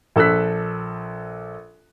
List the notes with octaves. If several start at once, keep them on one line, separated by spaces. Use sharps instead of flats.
A#1 A4 E6 F#6 B6